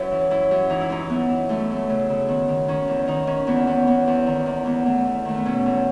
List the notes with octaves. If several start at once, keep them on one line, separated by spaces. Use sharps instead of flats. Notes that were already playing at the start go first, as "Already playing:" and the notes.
Already playing: F#2 E4 B4 C#5
E3
F#2 E4
F#2
E3 D#4
E4
F#2 D#4
F#2 B3
E3
F#2 A3
F#2
A3
C#3
C#3
D#3 B3
D#3
D#3 C#4
E2
D#3 D#4
D#3 C#4
E2 B3
E2 B3
E2 B3
E2
D#3
E2
E2 B3
E2 A3
E2
D#3 A3
B3
B2 C#4
E2